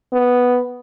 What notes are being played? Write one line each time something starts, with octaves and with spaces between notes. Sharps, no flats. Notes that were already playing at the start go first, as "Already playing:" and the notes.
B3